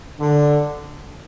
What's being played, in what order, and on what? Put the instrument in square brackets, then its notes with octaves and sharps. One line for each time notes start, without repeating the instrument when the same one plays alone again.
[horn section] D3